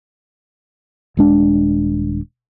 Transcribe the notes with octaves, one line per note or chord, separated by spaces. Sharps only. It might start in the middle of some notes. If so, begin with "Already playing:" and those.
D#1 G#3 D4